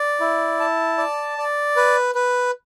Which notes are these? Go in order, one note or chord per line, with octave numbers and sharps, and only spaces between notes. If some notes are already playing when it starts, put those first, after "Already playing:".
Already playing: D5
E4
A5
D5
D5
B4
B4